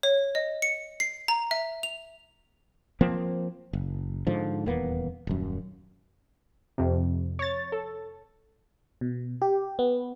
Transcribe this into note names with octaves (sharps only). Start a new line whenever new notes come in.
C#5
D#5
C#7
C7
A#5
E5
F7
F3 A#3 C4
F#1
G#2 D3 F3
D#1 E2 A#3 B3
D#1 F#2
F2 C3
C#5 A6
A4
B2
G4
B3